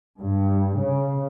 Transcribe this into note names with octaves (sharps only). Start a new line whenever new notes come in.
G2
C#3